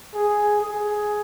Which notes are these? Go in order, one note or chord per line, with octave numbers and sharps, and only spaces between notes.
G#4
G#4